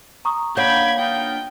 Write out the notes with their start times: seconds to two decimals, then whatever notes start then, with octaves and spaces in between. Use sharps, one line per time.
0.25 A#5 C#6 D#6
0.57 A#3 D4 C#5 F#5 G5 B5 G6 G#6
0.99 B3 D#4 F4 G5